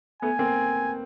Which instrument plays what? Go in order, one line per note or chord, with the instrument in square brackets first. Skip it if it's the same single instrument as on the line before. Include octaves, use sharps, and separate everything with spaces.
[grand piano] A3 B3 [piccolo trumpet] G#5
[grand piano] A#3 C4